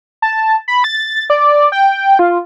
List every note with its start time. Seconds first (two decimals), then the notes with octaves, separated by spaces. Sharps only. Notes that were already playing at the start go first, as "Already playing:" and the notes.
0.22 A5
0.68 B5
0.84 A6
1.30 D5
1.72 G5
2.19 F4